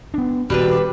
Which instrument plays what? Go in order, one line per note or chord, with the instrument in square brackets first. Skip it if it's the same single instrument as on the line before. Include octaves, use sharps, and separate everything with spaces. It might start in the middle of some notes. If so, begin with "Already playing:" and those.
[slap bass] B3 D4
[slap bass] D#1 [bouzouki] G3 D4 B4 [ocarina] F#4